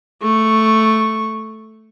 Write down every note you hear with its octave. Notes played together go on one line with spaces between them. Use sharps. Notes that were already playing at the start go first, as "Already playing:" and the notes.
A3 C#6